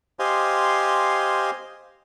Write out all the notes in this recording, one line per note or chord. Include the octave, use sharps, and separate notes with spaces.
G4 C5 D#5 F5 G#5 C6